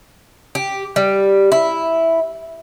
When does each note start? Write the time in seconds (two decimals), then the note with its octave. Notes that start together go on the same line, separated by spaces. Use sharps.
0.55 G4
0.96 G3
1.52 E4